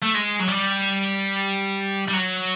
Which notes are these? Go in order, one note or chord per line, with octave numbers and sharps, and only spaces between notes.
A3
G#3
F#3
G3
G3
F#3